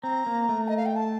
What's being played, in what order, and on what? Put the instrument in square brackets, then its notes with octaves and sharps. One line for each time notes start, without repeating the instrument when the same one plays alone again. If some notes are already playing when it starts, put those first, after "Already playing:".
[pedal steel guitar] C4 [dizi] A#5
[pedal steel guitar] A#3
A3
[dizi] D#5
F5
G5
A5